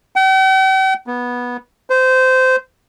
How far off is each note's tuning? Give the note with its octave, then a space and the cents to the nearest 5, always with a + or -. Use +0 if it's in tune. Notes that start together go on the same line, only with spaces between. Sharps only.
G5 -45
B3 -15
C5 -20